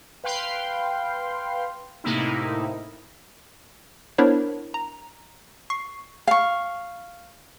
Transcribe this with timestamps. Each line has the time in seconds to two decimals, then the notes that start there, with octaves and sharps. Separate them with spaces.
0.24 B4 F5 G5 C6
2.04 A2 C3 A#3 D#4 E4
4.18 B3 D4 E4 A#4 C5 C#5
4.74 A#5
5.70 C#6 C7
6.27 F5 C#6